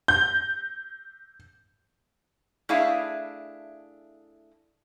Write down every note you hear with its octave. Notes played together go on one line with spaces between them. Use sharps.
G6
A3 D4 E4 G#4 E5 F5